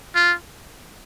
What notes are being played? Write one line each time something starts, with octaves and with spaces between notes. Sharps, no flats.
F4